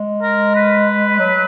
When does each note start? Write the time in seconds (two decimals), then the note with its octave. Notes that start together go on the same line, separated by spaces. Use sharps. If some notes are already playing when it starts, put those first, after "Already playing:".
Already playing: G#3
0.22 A#4
0.55 B4
1.19 F#3